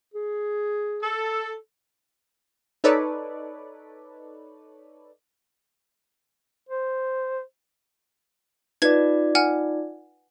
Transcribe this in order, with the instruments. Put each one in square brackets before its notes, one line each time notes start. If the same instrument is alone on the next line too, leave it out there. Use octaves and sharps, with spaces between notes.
[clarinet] G#4
[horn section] A4
[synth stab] D#4 A4 B4 C#5 D5
[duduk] C5
[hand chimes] D#4 F4 D5 [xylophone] B4 G#6
[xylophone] F#5 G#5 F6